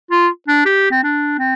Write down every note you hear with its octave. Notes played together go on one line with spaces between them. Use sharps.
F4
D4
G4
C4
D4
C4